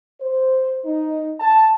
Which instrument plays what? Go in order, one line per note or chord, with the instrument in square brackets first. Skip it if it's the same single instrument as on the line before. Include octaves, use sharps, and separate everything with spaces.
[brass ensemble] C5
D#4
A5